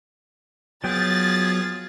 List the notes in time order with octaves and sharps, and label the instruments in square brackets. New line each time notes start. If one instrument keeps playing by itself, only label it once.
[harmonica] F3 G#4 [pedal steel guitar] F#3 B3 G5 [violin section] A6